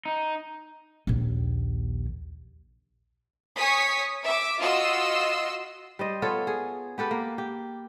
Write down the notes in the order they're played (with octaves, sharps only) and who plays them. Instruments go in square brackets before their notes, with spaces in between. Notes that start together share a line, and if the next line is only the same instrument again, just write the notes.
[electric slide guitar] D#4
[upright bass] A#1 D#2
[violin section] C#5 G#5 C#6 D#6 B6
E5 D6
F4 F#4 D#5 C6 E6
[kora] G3 C5 D#5
B3 F4 A4 C#5
G#4
B3 G4 A4 B4
A#3
G4